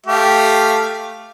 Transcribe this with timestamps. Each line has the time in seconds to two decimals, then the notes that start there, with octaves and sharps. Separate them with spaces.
0.06 A3 G4 F5